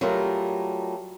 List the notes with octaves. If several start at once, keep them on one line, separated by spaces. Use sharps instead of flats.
F#3 G3 A3 F4 A#4